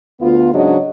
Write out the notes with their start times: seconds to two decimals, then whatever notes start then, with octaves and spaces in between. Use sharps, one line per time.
0.21 D2 B3 F4
0.53 G#2 C#3 F#3 D4 C#5 D#5